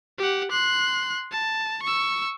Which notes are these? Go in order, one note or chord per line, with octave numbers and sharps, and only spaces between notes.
G4 F#5
C6 F#6
A5
C#6 E6